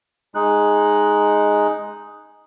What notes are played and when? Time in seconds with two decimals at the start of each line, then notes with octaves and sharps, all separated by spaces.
0.35 G#3 D#4 F#6